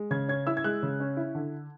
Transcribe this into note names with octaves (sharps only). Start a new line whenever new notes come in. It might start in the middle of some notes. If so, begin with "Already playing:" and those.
Already playing: G#3
C#3 G#6
C#4 G#6
E4 E6
G#6
G#3 F#6
C#3
C#4
E4
D3